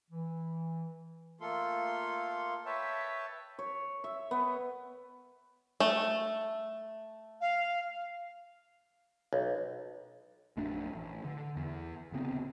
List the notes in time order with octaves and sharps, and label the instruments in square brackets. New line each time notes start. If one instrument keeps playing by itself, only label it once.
[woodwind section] E3
[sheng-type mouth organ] A3 A#3 F4 A4 C6
B4 C#5 E5 G5 A5
[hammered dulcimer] C#5
E5
B3
[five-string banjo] A3
[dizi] F5
[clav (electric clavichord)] B1
[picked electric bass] A#1 F#2 A3 D4
A1
D3
E2
D1 C#3 B3 C4